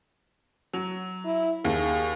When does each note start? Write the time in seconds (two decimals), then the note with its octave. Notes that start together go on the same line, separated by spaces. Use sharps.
0.73 F#3
1.25 E4
1.65 D#2 G#4